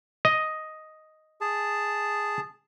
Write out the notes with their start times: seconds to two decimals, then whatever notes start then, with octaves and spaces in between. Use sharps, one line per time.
0.25 D#5
1.41 G#4 A5